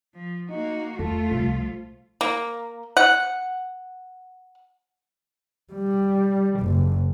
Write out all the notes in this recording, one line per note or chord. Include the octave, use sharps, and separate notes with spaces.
F3
A#3 D#4 F#4
E2 A3 F4 A4
C2 F3
A#3
F#5
G3
F#1